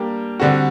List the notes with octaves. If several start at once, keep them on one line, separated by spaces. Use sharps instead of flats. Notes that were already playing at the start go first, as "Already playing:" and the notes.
Already playing: G3 A#3 D4 G4
D3 G3 C4 F#4